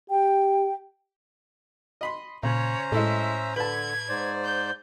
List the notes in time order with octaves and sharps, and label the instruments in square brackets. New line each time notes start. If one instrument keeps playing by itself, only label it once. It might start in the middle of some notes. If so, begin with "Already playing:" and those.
[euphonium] G4 [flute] G5
[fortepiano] D#5 B5 C6
[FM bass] A#2 [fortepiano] C#3 [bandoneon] C#4 C5 A#5 [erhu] C#5
[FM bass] A2 [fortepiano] G#3 E4 A4 [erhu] E5
[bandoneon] D3 [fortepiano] B4 A5 [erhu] G#6
[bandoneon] G#2 C5 D5
[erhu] G6